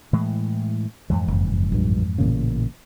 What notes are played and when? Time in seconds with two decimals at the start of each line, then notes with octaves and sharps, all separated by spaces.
0.13 A2 E3 G#3
1.10 F2 G#2 E3
1.28 F#1
1.72 A#1 G2
2.18 A1 A#2 C#3